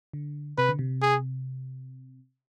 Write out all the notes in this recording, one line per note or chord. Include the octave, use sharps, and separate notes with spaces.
D3
C3 B4
D3
C3
G#4